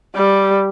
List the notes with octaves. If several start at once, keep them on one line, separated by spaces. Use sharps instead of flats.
G3